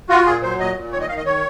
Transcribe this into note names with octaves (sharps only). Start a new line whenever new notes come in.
F4 F#4
A#2 G#4
F#3 C5
A#2 D#5
A#2
D#3 C#5
D#5
D#3 F5
D#5
D#3 C#5